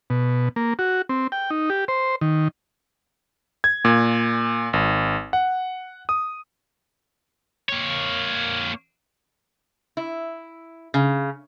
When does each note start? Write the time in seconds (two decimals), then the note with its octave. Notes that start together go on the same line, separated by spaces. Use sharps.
0.10 B2
0.56 A#3
0.79 F#4
1.09 C4
1.32 G5
1.51 D#4
1.70 G4
1.88 C5
2.21 D#3
3.64 G#6
3.85 A#2
4.73 G#1
5.33 F#5
6.09 D#6
7.69 A#3 C#5
9.97 E4
10.94 C#3